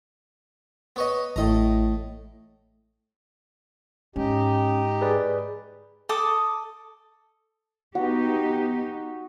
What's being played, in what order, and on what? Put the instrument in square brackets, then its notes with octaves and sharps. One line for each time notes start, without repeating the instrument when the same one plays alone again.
[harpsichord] B3 C#5 D#5
[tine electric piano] A1 E4 [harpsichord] A2 D#5 A#5
[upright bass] G#2 [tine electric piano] C#4 [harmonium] D#4 G4
[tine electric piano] G#4 B4 D5
[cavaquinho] A4 A5 D6 D#6
[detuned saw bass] B3 [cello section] D#4 G4 [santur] F#4 F#5